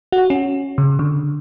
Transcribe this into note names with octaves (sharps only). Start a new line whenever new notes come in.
F#4
C#4
C#3
D3